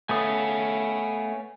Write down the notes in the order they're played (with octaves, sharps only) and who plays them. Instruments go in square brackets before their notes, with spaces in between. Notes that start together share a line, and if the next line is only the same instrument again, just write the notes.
[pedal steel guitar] A3 B3 D#6 [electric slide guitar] C#5 F5 G#5